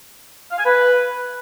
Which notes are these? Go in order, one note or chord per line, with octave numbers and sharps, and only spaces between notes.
F5
G#5
B4